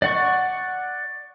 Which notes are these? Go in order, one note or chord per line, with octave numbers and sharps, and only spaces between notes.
D5 F#5 C#6